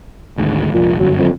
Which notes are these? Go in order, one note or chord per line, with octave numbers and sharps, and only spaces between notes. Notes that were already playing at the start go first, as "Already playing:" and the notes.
G#1 D2 G#2
F1 A#1 A#2
G1 F#2 F#3
F2